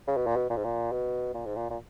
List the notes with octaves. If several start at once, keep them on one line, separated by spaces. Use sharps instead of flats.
C#3
B2
A#2
B2
A#2
G#2
A#2
B2
A#2
G#2
A#2
A#2